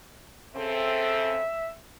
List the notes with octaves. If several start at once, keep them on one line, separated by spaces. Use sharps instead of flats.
C#3 C4 A4 E5